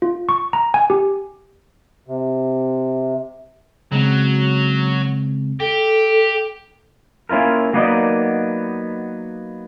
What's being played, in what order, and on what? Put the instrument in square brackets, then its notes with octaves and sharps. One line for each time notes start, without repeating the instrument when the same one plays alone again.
[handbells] F4
C#6
A#5
G#5
G4
[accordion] C3
[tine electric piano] C#3 G#3 C4 [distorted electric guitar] F#3
[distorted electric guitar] G4 [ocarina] A4
[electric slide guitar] A#3 C#4 E4 F4 A#4
F#3 A#3 B3 D4 D#4 D5